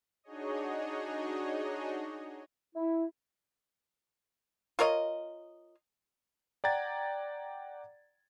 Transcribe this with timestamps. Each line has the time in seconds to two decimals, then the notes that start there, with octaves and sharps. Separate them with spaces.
0.24 D4 D#4 F#4 G#4 C#5 D#5
2.75 E4
4.79 F4 A#4 C#5 D#5
6.64 D5 F#5 G5 A#5 G#6 A6